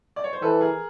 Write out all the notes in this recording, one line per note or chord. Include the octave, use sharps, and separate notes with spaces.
D5
C#5
C5
E3 A4 B4
G#4 A#4